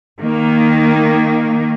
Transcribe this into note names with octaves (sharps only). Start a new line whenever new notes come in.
D#3 A#3